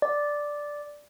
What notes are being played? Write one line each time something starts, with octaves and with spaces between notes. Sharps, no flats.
D5